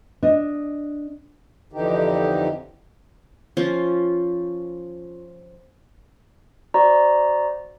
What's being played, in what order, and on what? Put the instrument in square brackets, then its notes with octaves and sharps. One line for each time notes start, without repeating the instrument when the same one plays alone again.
[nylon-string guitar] D4 D#5
[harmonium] F2 D3 E3 D#4 G4
[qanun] F3 C#4 F4
[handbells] F#4 C5 D5 A#5